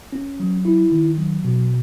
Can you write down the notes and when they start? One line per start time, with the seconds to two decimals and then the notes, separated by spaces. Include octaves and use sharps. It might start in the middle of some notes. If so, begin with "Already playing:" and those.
0.13 C#4
0.40 F#3
0.65 E4
0.92 D#3
1.18 F#3
1.45 B2